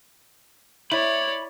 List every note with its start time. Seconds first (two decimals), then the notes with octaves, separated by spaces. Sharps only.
0.91 E4 C#5 D5 B5